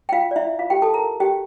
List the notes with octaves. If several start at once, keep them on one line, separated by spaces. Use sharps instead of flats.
G5
F4 F5
D5
E4 E5
F4 F5
G4 G5
A4 A5
A#4 A#5
G4 G5